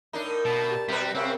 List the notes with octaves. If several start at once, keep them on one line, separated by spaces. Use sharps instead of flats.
A2 D4 D#4 A#4 D5
B2 A5
G4 B4 D5
B2 G3 C4 F#4 A#4 B4
C3 C4 C#4 A#4 E5 F#5 D6 D#6